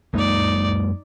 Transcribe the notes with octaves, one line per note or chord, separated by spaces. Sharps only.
F#2 G#3 A#3 D#4 D5